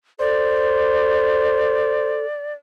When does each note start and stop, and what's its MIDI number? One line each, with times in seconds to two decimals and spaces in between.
0.19 2.26 69
0.19 2.21 72
0.19 2.54 74